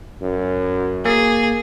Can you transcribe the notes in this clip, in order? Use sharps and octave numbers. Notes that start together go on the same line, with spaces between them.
F#2
A#3 G#4